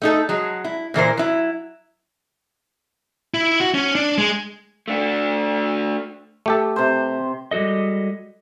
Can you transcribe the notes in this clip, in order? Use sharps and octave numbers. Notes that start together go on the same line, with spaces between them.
A3 D#4 A4
F#3 G#3
E4
A#2 E3 A#4 C5
F#3 E4
E4
F#4
C#4
D4
G#3
A3 D4
A3 G4 A4
C3 C5
G3 G#3 F#4 A4 D#5